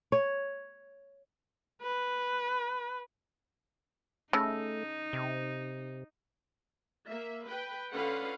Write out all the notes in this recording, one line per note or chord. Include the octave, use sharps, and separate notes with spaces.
C#5
B4
C#3 A3 D#4 A5 E6 A#6
C3
A#3 E5
B4 G5
D3 C#4 F4 B4 F5 F#5